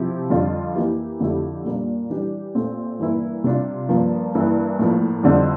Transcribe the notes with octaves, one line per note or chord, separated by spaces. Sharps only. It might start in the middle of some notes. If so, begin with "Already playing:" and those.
Already playing: C3 F3 C4 E4 G4
F2 D3 G3 D4 F4
E3 A#3 E4 G4
F2 D3 A3 E4 G4
A#2 G3 A#3 D4
E3 G3 D4 G4
A#2 A3 C4
G2 E3 A#3 E4
C3 G3 D4 F4
G2 F3 A#3
G2 E3 A#3 E4
A2 F3 A#3
F2 D3 G3 C4 E4